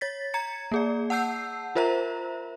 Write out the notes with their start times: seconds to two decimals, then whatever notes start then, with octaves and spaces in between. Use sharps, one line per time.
0.01 C#5 A6 B6
0.34 A#5 G#6 C#7
0.72 A#3 G#4 D5
1.10 F#5 A5 E6 G6 C7
1.75 F4 A#4 C5 E5 A#5